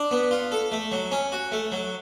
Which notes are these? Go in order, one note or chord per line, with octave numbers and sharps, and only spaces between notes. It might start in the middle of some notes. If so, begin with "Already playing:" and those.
Already playing: D4
B3
F4
A4
A3
F#3
C#4
F#4
A3
F#3